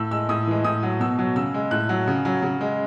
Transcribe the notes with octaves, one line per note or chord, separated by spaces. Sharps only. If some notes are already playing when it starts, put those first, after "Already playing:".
Already playing: A2 E6
G#3 E6
A2 D#6
E3 G#3
A2 D#6
F#3
B2 E6
F#3
C#3 E6
G#3
A2 F#6
F#3
C#3
F#3
C#3
G#3